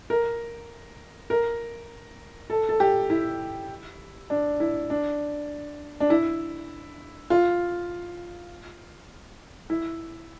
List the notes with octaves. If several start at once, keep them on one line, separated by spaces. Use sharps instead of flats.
A#4
A#4
A4
A4
G4
E4
D4
E4
D4
D4
E4
F4
E4